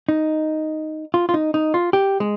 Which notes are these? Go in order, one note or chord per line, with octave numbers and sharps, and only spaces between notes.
D#4
F4
F4
D#4
D#4
F4
G4
G#3